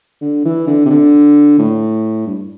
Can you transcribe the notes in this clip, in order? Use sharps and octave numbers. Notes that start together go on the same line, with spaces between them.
D3
E3
D3
C3
D3
A2
G2